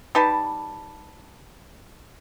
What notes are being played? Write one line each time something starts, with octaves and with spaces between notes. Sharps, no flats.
G3 D#4 B4 A5